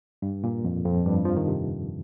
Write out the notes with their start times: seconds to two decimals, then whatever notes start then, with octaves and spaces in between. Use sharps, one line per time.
0.22 G2
0.44 A#2
0.65 F2
0.85 F2
1.06 G2
1.25 F3
1.37 D#3
1.48 C3